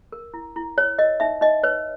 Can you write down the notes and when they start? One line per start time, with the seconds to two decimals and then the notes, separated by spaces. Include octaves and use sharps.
0.12 A#4
0.34 E4
0.56 E4
0.78 C#5
0.98 A#4 D#5
1.20 D#4 E5
1.41 D#4 D#5
1.63 B4 C#5